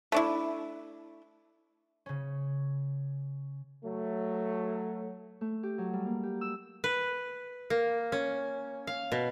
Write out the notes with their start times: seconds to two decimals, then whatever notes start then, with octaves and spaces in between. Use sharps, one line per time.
0.12 A3 D4 E4
2.06 C#3 C#4
3.84 F#3 A3
5.41 A3
5.63 G4
5.78 F#3
5.93 G3
6.06 A#3
6.23 G4
6.41 E6
6.84 B4
7.70 A#3
8.12 C#4
8.87 F5
9.12 B2